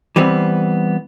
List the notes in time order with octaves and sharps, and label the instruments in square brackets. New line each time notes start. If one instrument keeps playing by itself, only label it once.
[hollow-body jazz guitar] E3 G3 B3 C4